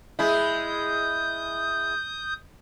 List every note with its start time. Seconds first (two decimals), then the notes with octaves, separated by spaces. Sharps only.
0.19 G#3 E4 D#6 G6